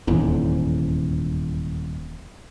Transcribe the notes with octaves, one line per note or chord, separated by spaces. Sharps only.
D#1 E2 G#2